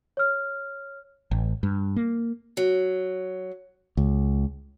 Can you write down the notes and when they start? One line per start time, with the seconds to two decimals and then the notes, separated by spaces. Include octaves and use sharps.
0.17 C#5 F6
1.31 A1
1.63 G2
1.96 A#3
2.57 F#3
3.97 C#2